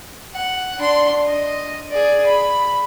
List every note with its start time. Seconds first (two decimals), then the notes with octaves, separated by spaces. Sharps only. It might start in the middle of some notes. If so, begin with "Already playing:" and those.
0.34 F#5
0.78 D4 C6
1.26 D#5
1.89 G#4 D5
2.26 B5